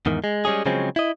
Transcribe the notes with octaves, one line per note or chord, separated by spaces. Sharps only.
E2 G#2 D#3
G#3
G3 G#3 C#4 G#4
C#3 F3 F#3 G#3 C4 C#4
E4 D#5